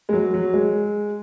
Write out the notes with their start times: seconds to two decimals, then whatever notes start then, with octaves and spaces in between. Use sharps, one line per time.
0.09 G#3
0.13 F#3
0.34 F#3
0.54 G#3